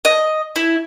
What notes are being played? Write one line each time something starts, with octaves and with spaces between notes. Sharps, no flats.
D#5
E4